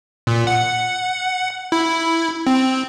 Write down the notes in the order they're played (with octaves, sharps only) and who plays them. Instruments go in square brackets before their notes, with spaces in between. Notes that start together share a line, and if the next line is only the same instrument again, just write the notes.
[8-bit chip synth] A#2
F#5
E4
C4